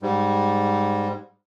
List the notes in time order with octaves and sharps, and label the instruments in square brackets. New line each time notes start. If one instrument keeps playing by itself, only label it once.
[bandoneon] G#2 G3